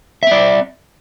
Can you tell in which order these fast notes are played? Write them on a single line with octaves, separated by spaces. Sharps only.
E5 C4 D5